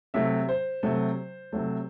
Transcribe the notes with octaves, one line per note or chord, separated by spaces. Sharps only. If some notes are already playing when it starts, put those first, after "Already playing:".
C3 F#3 A3 E5
C5
C3 F#3 A3
C3 F#3 A3